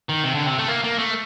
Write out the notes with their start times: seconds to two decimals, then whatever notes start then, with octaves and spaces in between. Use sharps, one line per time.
0.09 D#3
0.24 C3
0.35 D3
0.46 C3
0.58 A3
0.68 A#3
0.84 A#3
0.98 A3